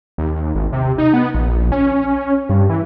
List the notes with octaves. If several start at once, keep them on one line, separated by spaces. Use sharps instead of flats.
D#2
G#1
C3
D#4
B3
A#1
C#4
G2
E3